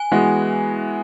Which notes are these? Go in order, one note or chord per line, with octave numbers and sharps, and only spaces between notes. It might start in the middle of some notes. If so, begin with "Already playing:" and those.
Already playing: G#5
E3 G#3 B3 F#4